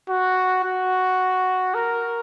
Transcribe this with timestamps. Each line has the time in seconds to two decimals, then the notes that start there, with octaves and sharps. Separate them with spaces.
0.09 F#4
0.65 F#4
1.75 A#4